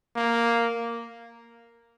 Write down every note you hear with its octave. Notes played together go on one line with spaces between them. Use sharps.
A#3